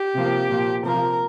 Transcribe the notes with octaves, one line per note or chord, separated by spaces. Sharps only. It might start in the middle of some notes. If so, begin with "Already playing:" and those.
Already playing: G4
C3 F3 A#3
A#2 F3 A#3
C3 F3 A#3 A#4